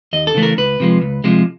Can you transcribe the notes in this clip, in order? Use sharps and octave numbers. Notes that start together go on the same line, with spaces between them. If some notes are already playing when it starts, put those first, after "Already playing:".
D#2 D#5
A4
C#3 E3 A3
A#4
C#2 B4
C3 F3 G#3
C#2
C3 F3 G#3